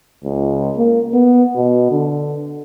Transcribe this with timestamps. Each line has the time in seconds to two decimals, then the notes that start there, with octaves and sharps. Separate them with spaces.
0.24 C#2
0.77 A#3
1.14 B3
1.56 B2
1.91 D3